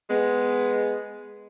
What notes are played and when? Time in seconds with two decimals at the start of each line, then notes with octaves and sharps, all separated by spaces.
0.10 G#3 B3